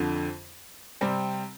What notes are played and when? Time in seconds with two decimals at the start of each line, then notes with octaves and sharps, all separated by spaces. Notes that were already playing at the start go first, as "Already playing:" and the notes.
Already playing: F2 D3 F3
1.01 C3 G3 C4